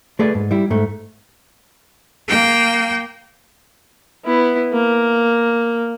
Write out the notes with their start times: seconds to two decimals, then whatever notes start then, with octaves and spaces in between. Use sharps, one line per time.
0.19 A3 G#4 B4 D5
0.35 G#2
0.51 G3 E4
0.70 G#2 A3
2.28 A#3 G5
4.25 B3 E4
4.72 A#3